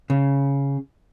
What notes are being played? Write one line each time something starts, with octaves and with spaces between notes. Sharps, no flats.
C#3